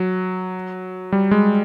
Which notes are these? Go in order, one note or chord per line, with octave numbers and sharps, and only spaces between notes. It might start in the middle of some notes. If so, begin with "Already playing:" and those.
Already playing: F#3
G3
G#3